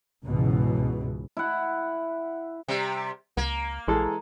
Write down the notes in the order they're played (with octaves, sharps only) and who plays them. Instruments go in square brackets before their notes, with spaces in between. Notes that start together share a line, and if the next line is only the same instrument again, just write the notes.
[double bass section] C#2 G#2 B2 E3
[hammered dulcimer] E4 F#5
[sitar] C3 G3
[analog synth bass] C#2 [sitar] A#3
[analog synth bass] A#1 [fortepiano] E3 G#3 A4